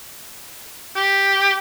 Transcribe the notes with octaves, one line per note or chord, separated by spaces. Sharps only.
G4